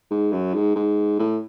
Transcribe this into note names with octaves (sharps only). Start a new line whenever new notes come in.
G#2
F#2
G#2
G#2
A2